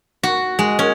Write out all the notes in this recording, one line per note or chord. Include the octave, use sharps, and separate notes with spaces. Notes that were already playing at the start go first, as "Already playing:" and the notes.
F#4
G#3
C#4